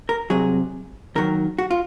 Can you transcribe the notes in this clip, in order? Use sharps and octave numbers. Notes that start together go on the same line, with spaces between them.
A#4
C2 C3 F#3 G#4
D#2 D#3 F#3 A#4
F#4
F4